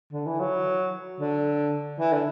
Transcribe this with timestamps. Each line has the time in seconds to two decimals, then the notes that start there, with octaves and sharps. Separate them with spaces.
0.13 D3
0.27 E3
0.40 F#3
1.20 D3
2.00 E3
2.13 D3